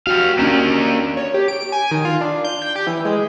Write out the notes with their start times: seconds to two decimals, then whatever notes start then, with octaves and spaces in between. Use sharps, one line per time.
0.07 F#4 G4 F5
0.39 A#3 C#4 D4 G4 A#4
1.17 C#5
1.34 G4
1.48 D7
1.72 G#5
1.91 D#3
2.05 F4
2.21 D4
2.45 G6
2.62 G5
2.76 G4
2.87 E3
3.05 G#3